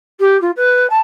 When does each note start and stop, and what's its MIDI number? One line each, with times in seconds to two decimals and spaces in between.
0.20 0.40 67
0.41 0.51 65
0.56 0.86 71
0.89 0.99 81